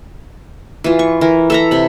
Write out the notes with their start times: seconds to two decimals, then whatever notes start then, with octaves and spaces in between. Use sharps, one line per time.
0.84 E3 F4
0.99 C#6
1.21 E3 A#4
1.50 A4 E5 A#5
1.71 C3 B5